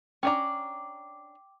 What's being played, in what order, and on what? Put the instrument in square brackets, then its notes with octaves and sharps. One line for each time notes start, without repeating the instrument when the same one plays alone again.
[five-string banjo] C#4 D4 A#5 [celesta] G5 D6